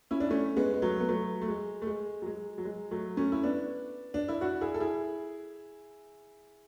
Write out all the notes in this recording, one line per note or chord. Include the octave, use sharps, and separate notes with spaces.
C#4 E4
D4
A3 C#4
G#3 B3
G#3
F#3 A3
B3
F#3 A3
A3
G#3
A3
G#3
F#3
G#3
F#3
G#3
F#3 A3
A3 C#4
E4
B3 D4
D4
E4
D4 F#4
E4 G#4
A4
E4 G#4